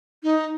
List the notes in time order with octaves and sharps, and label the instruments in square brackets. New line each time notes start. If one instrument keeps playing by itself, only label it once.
[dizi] D#4